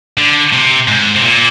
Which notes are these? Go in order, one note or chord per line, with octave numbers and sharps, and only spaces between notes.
D3
C3
G#2
C3
A#2